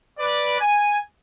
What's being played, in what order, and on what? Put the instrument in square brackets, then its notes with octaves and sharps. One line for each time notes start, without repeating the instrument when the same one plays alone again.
[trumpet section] B4 D5
G#5